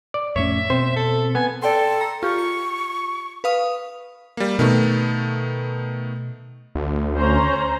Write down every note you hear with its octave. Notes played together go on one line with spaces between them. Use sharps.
D5
F2 A2 C#4 C#5 E5
B2 C4 C5
A4
B3 G#5
A4 D5 G5 C6
A#5
F4 G4 C#6
C#7
B4 F5 D#6
G3 A#3
B2 D#3 A3 B3
D2
C#4 C5 A#5